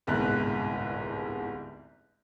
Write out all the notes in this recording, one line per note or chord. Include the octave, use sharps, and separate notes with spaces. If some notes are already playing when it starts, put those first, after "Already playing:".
D1 G1 C2 G#2 F#6